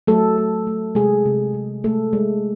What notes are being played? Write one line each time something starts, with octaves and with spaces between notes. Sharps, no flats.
F#3 A3 A4
A3
A3
C3 G#3 G#4
C3
C3
G#3 A3 A4
G#3